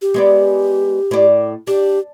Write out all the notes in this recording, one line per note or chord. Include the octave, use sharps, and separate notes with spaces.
G4
G#3 B3 D5
A2 D5
D4 G4